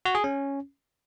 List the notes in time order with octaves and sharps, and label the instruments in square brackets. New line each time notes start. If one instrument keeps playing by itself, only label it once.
[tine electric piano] F#4
G#4
C#4